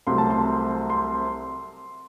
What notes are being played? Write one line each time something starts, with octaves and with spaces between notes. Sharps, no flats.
C2 C3 F#3 A3 C6
A5
C6
C6